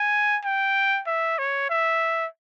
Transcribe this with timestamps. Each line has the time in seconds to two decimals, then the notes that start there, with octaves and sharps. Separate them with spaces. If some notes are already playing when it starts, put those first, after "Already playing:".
Already playing: G#5
0.44 G5
1.07 E5
1.38 C#5
1.70 E5